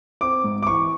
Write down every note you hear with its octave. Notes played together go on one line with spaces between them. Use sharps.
C4 D6
G#2
D6
E3 C#6